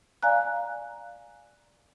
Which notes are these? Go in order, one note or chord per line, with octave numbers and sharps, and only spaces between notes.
D5 F5 G#5 A#5 F#6